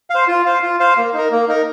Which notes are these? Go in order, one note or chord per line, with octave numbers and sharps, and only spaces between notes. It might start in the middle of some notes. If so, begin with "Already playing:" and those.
C5 F5
F4
C5 F5
F4
C5 F5
A#3
D#4 A#4
A#3
D#4 A#4